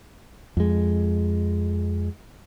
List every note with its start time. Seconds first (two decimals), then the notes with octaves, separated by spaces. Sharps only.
0.57 F2 G#3